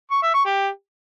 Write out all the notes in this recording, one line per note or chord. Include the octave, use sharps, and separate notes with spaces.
C#6
E5
C#6
G4